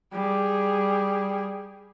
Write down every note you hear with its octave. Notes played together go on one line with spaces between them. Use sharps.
G3 G#4